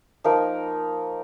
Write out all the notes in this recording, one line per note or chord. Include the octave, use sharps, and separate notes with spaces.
F3 A#3 D#4 A#4